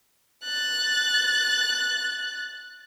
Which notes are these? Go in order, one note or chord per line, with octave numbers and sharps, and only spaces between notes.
F#6 A6